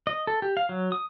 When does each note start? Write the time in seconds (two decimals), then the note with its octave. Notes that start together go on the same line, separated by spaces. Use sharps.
0.07 D#5
0.27 A4
0.42 G4
0.57 F5
0.69 F#3
0.92 D#6